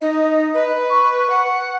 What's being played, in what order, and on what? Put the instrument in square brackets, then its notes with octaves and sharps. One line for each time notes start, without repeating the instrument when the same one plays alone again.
[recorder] D#4 [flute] D#5
[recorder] B4
[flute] C#6
[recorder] F#5